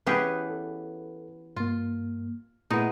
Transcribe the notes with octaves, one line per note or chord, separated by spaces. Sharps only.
E3 B3 C#4 G4 G#4 B4
A4
G2 A#3 F4
A#2 G#3 A3 B3 D#4 E4